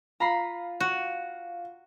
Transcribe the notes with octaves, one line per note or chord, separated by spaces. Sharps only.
F4 A#5 B5 C7
F#4